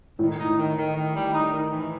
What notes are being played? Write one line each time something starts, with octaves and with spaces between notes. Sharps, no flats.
A2 D#3
D#4
D#3
D#3
D#3
G3
D#4
D#3
E3